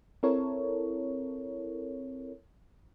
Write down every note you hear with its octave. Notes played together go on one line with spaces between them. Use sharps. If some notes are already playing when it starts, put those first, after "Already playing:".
C4 E4 A4 A#4 C#5